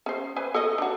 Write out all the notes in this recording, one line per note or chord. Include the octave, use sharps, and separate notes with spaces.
C#4 C5
B4 C5 G#5
A4 C#5 D#5
D4 F#4